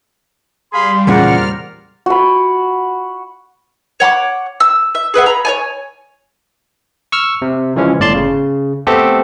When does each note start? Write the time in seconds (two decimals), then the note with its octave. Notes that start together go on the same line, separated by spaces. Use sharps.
0.73 G3 G#4 F5 B5 C6
1.07 E2 A#2 C#3 A#4 C5 D5 F#5 F6
2.06 F#4 B5
4.00 C#5 F#5 B5 D6
4.60 E6
4.95 E5
5.14 G#4 B4 E5 F#5
5.26 A#5 B5
5.45 C#5 D5 G#5
7.12 C#6 E6 F6
7.42 C3
7.76 C#3 E3 F3 G#3 C#4
8.00 G1 A2 D5 A5 C6
8.15 C#3
8.87 A3 B3 C4 G4 A4